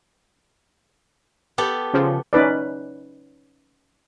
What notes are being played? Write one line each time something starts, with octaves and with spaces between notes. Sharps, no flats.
B3 G4 A4
C#3 F3
C#4 D#4 B4 D5